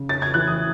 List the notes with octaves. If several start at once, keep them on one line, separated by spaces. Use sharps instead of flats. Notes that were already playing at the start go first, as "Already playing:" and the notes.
Already playing: C#3
C#4 A6
G#6
E3 F#6
D#6